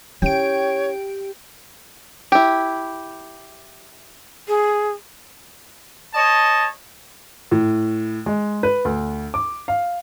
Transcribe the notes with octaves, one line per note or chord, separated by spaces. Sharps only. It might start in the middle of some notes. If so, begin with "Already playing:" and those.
C#4 E4 G4 C#5 G5 D7
E4 G4
G#4
C#5 D#5 A5
A2
G#3
B4
D2
D6
F5